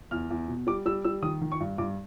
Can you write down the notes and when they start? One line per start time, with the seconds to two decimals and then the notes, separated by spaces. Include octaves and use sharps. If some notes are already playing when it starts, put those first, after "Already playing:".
0.11 E2 F6
0.30 E2
0.48 B2
0.67 G3 D6
0.86 G3 E6
1.05 G3 E6
1.22 D#3 D#6
1.41 D#3
1.52 C#6
1.61 G2
1.78 G2 D6